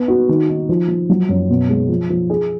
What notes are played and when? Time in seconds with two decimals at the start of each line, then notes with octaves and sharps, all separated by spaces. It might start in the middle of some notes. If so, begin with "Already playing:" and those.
Already playing: B3
0.08 F#4
0.29 D#3
0.48 D#4
0.69 F3
0.88 F3
1.09 F#3
1.29 F#2
1.49 B2
1.69 G#3
1.89 F3
2.10 F3
2.30 G#4